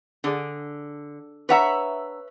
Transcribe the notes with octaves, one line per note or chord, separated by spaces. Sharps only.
D3 D4 G#4 D5
D4 B4 C#5 E5 F#5 A#5